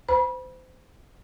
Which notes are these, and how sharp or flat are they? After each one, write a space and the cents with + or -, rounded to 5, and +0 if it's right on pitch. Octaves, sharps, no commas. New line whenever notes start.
C5 -30 B5 -30